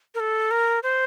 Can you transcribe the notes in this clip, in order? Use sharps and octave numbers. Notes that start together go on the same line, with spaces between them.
A#4
A4
A#4
C5